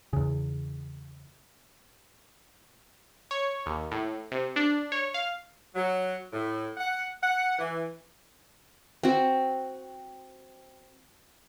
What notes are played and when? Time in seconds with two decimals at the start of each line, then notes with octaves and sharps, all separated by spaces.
0.13 E2 C#3
3.31 C#5
3.66 D#2
3.92 A2
4.32 C3
4.56 D4
4.92 C#5
5.14 F5
5.75 F#3
6.32 A2
6.77 F#5
7.21 F#5
7.58 E3
9.03 C4 F#4